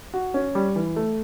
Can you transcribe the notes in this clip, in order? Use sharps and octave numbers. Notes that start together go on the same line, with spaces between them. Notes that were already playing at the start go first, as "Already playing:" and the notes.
F#4
C#4
G3
E3
A3